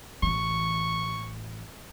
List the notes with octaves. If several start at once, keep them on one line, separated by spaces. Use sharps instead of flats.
A1 E3 C#6